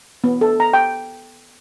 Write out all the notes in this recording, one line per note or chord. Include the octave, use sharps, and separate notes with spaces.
B3
A4
A#5
G5